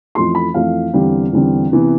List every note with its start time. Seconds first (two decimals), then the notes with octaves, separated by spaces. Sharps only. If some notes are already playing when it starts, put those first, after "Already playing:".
0.15 F2 E3 A3 C6
0.35 B5
0.54 F2 E3 A3 F5
0.93 E2 D3 G3 C4
1.33 E2 D3 G3 C4
1.72 C3 E3 B3